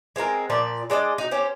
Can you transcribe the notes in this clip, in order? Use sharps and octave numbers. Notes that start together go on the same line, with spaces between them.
G#3 C4 F4 A#4
A#2 F3 D5
G#3 D4 D5 D#5
D#4 F#4
C#4 G4 C5